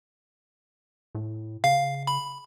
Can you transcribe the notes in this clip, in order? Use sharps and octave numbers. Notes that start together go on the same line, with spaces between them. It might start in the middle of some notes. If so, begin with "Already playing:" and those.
A2
C#3 F5
B5